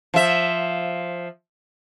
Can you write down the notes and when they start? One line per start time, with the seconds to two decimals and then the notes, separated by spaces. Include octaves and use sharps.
0.14 F3 E5